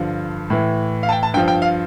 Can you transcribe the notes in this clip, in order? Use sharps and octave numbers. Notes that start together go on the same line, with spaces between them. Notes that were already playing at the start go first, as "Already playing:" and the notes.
Already playing: G2 D3 F3
A2 E3
F5
A5
G5
A5
G2 F3 G5
G5
F5